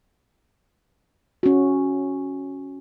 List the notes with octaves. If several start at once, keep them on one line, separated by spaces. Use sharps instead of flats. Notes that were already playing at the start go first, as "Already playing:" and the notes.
C#4 F#4